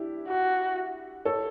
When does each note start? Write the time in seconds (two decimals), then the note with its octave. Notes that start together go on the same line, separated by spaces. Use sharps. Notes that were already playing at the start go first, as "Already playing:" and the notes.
Already playing: D4 E4 G4
0.28 F#4
1.25 A4 C#5